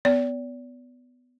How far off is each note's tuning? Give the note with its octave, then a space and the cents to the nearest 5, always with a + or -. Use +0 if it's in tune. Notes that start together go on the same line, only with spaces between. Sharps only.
B3 +15 D5 -40